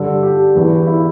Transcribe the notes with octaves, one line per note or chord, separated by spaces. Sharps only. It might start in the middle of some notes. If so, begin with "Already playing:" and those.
Already playing: G2 D3 A4
G4
E2 E3
E4